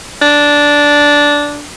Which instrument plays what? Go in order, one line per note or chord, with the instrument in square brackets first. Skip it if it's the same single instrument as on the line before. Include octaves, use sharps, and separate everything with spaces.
[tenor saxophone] D4